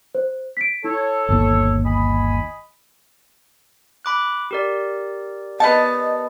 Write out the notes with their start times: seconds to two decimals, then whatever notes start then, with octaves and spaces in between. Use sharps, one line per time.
0.15 C5
0.57 B6 D7
0.84 E4 A4 C#5
1.29 G1 D#2
1.85 D#5 G#5 B5
4.05 B5 D6 F#6
4.51 G4 A#4 D5
5.60 B3 D#5 A5